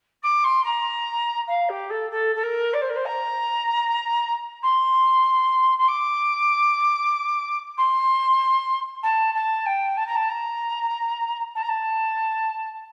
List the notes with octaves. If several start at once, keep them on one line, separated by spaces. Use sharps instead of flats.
D6
C6
A#5
F5
G4
A4
A4
A4
A#4
D5
C5
A#4
C5
A#5
C6
C6
D6
C6
A5
A5
G5
A5
A#5
A5
A#5
A5
A#5
A5